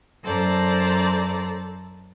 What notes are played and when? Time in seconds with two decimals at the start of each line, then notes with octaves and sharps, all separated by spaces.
0.24 F#2 A4 C5 D5 A#5